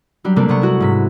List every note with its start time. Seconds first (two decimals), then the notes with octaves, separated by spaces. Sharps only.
0.24 F#3 G3 D4 G4
0.36 C3 G3 A3 A#3 C4 D4
0.49 C3 B3 F#5 C#6
0.62 E4 F#4
0.80 G#2 C3 B6